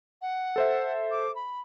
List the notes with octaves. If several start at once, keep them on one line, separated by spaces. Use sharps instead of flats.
F#5
A4 C5 E5
D6
B5